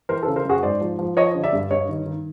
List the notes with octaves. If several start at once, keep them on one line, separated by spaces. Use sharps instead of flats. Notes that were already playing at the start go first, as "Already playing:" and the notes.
E3 A#4 C5
A4 B4
C#3
A#4 C5
F#2 F#4 G#4
G#2 C5 D5
F3
F3
F3 C#5 D#5
D3
D5 E5
G2
G2 C#5 D#5
D#3
D#3